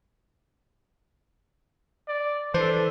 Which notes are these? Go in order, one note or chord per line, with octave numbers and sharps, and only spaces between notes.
D5
E3 D4 A4 C5